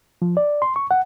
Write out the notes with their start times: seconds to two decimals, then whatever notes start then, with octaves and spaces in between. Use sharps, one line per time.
0.22 F3
0.37 D5
0.62 C6
0.76 C#6
0.91 F#5